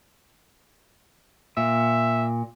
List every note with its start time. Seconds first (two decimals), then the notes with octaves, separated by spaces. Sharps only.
1.57 A#2 E5